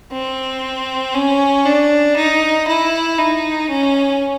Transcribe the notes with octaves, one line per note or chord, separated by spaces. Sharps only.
C4
C#4
D4
D#4
E4
D#4
C#4